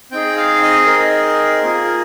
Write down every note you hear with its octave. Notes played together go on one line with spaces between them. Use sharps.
C4 D#4 G#4 G5
F5
D#5
A#4
A#3 F4 G#4